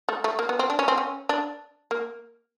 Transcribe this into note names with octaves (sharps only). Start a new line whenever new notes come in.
A3
A3
A#3
B3
C4
D4
C#4
C4
C#4
D4
A#3